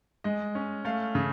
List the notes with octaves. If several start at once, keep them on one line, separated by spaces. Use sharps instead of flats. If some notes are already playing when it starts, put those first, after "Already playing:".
G#3 D#5
C#4
A3 F5
C#3